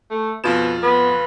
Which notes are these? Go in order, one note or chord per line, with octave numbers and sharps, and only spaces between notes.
A3
F2 B2 F4 E7
B3 B4